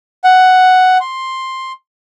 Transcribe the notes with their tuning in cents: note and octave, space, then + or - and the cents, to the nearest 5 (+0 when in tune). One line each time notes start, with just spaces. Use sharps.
F#5 +5
C6 +5